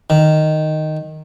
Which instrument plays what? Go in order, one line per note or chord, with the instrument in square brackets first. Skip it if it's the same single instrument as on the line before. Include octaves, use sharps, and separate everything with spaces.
[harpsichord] D#3